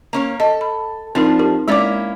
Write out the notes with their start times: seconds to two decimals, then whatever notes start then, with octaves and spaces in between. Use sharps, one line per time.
0.13 A#3 C#4 C#5
0.40 A4 D#5
0.61 B5
1.15 F3 C4 D4 D#4 A#4
1.39 G4 A#4
1.68 G#3 A#3 C#4 E4 D5 D6